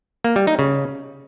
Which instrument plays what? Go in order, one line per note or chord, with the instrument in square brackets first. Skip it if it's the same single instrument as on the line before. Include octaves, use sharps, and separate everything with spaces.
[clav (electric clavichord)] A#3
G3
D#4
C#3